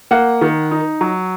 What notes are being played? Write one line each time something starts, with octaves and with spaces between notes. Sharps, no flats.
A#3 F#5
D#3
D#4
F#3